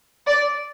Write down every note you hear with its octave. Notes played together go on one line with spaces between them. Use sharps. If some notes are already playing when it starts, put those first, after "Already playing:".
D5